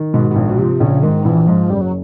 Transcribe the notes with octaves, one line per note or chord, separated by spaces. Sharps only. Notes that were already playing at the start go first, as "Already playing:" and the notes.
Already playing: D#3
G#2 B2
B2
A#1 A#2
B2
C3 F3
A#1 C#3
G#2 D#3
A#1 E3
G#2 F3
F#1 G3
F#3